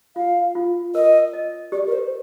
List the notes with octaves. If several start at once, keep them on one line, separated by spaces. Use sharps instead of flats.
F4 F5
F4
A#4 D#5
D#5
G4 D5
A#4
C5